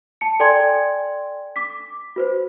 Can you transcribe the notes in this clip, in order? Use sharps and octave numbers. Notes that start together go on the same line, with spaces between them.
A5 C#7
A4 D5 G5 G#5 C6 G#6
D6 B6
F#4 B4 C5